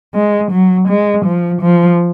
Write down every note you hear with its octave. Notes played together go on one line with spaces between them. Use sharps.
G#3
F#3
G#3
F3
F3